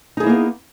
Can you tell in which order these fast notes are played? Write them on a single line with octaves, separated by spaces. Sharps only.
D#4 G#4 E4 A#3 B3